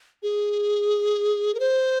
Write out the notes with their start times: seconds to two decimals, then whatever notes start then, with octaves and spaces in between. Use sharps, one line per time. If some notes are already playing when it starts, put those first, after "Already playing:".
0.23 G#4
1.55 A#4
1.60 C5